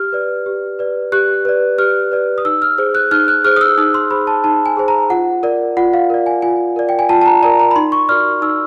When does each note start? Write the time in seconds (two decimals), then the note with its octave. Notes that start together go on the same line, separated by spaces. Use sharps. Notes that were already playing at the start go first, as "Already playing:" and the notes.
Already playing: G4 F6
0.12 B4 D5
0.46 G4
0.79 B4 D5
1.12 G4 F#6
1.45 B4 D5
1.78 G4 F6
2.12 B4 D5
2.38 D#6
2.45 D#4 E6
2.62 F6
2.78 G#4 C5
2.95 F#6
3.11 D#4 F6
3.28 F#6
3.44 G#4 C5 F6
3.56 D#6
3.61 E6
3.78 D#4 D#6
3.94 C6
4.11 G#4 C5 B5
4.27 A5
4.44 D#4 A5
4.66 G#5
4.77 G#4 C5
4.88 A#5
5.10 F4 F#5
5.43 A#4 D5
5.77 F4 F#5
5.94 F5
6.10 A#4 D5
6.26 G#5
6.42 F4 G#5
6.76 A#4 D5
6.89 G5
6.99 G#5
7.09 F4 A5
7.21 A5
7.26 A#5
7.43 A#4 D5 A#5
7.59 A#5
7.71 B5
7.76 D#4 C6
7.92 C#6
8.09 F#4 A#4 D5 F6
8.42 D#4 E6